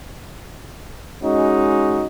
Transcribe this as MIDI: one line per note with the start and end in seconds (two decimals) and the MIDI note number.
1.23 2.07 56
1.23 2.07 61
1.23 2.07 63
1.23 2.07 66